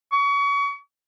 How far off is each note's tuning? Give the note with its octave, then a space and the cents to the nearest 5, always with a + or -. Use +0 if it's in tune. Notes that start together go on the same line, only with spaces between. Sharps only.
C#6 +35